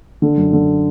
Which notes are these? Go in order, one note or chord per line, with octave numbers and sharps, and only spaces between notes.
D3
F#2
D3